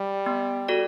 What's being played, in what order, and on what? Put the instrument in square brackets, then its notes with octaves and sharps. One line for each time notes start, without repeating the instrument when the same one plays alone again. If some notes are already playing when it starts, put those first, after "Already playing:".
Already playing: [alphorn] G3
[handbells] B3
F#4 A4 D5